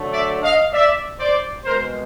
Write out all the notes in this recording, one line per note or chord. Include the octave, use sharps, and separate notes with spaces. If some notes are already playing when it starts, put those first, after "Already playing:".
Already playing: D3 F#3 A3
D5 E5
D#5 F5
D5 E5
C5 D5
B2 G#3 A#4 C5